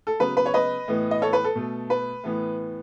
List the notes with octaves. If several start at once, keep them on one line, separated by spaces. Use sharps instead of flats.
A4
C#3 F#3 B3 B4
B4
C#5
B4 D#5
A2 E3 B3
D#5
A4 C#5
B4
A4
B2 A3
B4
A2 E3 B3